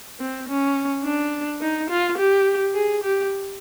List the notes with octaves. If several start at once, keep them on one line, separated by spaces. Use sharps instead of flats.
C4
C#4
D4
D#4
F4
G4
G#4
G4